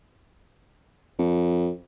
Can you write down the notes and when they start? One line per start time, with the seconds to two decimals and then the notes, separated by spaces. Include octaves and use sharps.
1.19 F2